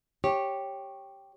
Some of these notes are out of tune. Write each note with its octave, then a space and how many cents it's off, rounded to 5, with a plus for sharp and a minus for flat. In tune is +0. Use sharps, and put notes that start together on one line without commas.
G4 +0 C#5 -15